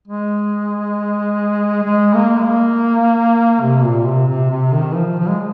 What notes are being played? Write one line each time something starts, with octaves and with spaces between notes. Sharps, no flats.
G#3
G#3
A#3
G#3
A#3
C3
A#2
C3
C3
C3
D#3
F3
F3
G#3